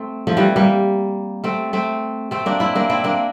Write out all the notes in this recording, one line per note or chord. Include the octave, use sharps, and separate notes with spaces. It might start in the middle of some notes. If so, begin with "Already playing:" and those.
Already playing: A3 C4
F3 A3
E3 G3
G3 A#3
A3 C4
A3 C4
A3 C4
A#3 D4
C4 E4
A#3 D4
C4 E4
A#3 D4